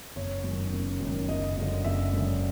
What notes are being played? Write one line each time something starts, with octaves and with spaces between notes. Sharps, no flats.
F#1 C#5
F#2 D#3
F#1
F#2 D#3
F#1 D#5
F#2 D3
F#1 E5
F#2 D3